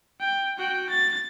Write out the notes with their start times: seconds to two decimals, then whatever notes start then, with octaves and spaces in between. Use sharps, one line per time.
0.20 G5
0.58 F#4 G5
0.90 A6